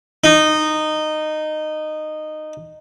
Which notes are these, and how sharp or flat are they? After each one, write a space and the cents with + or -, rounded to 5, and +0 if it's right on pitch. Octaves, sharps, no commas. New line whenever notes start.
D#4 -15